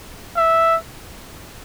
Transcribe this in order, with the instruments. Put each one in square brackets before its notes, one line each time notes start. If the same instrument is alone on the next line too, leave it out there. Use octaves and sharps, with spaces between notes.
[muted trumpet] E5